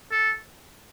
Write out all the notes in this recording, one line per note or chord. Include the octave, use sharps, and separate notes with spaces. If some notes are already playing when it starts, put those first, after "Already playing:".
A4